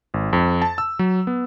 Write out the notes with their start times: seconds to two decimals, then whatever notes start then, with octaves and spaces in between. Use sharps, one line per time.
0.14 G#1
0.33 F2
0.62 A5
0.78 E6
0.99 F#3
1.27 B3